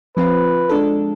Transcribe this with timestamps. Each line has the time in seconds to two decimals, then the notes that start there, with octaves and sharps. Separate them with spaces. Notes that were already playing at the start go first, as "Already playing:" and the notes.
0.17 F3 C4 F4 B4
0.69 G#3 D4 A4